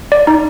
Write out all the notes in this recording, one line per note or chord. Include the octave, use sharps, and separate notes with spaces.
D5
D#4